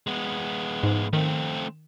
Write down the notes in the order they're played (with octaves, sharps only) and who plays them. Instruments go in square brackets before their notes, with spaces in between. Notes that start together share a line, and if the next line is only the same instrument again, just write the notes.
[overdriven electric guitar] G#3 B3
[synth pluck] G#2
[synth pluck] D#3 [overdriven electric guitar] A3 C4